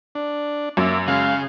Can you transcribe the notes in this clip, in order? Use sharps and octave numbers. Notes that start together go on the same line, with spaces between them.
D4
F#2 A#3 E5 D6
C#3 G#3 F5